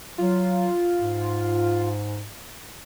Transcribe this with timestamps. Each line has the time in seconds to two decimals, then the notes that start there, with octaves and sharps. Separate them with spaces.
0.18 F#3 F4
1.00 G#2